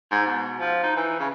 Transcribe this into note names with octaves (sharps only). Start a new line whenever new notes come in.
G#2
B2
F3
D#4
E3
C#3